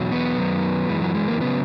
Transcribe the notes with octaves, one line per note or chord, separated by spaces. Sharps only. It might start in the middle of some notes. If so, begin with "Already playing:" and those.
Already playing: E2 B2 F#3
B3
F#2 D#3 F#3
F#2 E3 G#3
F#3
G#3
A#3
C#3 F#3 B3